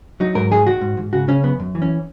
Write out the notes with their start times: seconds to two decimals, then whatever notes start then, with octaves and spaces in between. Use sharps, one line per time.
0.20 F#3 D#4
0.35 G#2 A#4
0.51 D#3 G#4
0.67 D#3 F#4
0.81 G#2
0.97 G#2
1.13 C#3 F#4
1.28 C#3 C#4
1.43 F#2 B3
1.60 F#2
1.75 E3
1.82 C#4